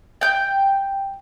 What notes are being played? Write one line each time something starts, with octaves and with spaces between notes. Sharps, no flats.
G5 G6